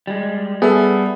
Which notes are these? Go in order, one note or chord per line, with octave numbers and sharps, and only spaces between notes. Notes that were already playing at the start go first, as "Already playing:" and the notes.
G3 G#3
G3 B3 G#4 A4 E5